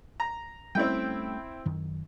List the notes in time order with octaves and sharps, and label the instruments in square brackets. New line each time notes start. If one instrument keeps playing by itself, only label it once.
[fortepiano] A#5
[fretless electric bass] G3 A3 C#4 [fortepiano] C4 E4 G5
[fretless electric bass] F#2 D#3